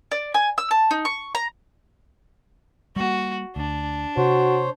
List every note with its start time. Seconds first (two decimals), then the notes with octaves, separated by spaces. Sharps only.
0.11 D5
0.34 G#5
0.58 E6
0.71 A5
0.91 D#4
1.05 C#6
1.35 A#5
2.96 G3 A#3 F#4
3.56 D2 D4
4.17 C3 F#4 C5 C#5